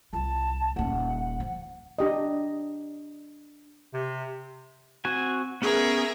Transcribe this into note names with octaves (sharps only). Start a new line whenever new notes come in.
C2 F4 A5
D#1 C#4 F#5
F3
D4 G4 D#5
C3
C4 F#4 G#5
B3 C#4 G#4 A#4 E5